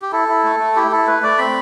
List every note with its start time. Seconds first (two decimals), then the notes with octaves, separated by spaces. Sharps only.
0.02 G4
0.12 E4 A4
0.28 E4
0.44 A3
0.60 A3
0.76 E4 G4
0.91 E4 A4
1.07 A3 B4
1.23 A3 D5
1.38 C4 B5